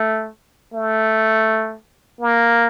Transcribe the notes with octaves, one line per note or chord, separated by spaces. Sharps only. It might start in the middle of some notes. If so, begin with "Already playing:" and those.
Already playing: A3
A3
A#3